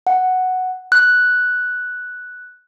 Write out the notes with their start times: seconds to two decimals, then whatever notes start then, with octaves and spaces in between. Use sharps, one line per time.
0.07 F#5
0.92 F#6